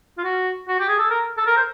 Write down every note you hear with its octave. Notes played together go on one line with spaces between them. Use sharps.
F4
F#4
F#4
G4
G#4
A4
A#4
A4
A#4
C5